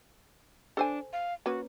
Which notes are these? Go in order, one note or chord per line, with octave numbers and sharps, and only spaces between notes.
D4 A4 C5 G#5
F5
A#3 C#4 F#4 B4